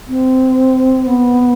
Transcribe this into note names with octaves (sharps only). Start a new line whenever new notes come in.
C4
B3